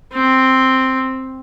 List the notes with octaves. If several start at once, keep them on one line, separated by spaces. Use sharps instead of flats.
C4